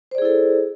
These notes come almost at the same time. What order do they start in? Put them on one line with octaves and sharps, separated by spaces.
C5 D5 G#4 E4 A4